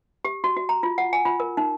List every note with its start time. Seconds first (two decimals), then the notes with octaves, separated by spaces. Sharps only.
0.25 G4
0.44 F#4
0.57 F#4
0.69 A#5
0.83 F4
0.98 F#5
1.13 G#5
1.25 F4
1.40 A#4
1.57 D#4